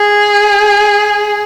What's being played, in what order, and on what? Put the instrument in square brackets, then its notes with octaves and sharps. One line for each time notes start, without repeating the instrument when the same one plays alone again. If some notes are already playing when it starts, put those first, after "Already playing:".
Already playing: [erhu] G#4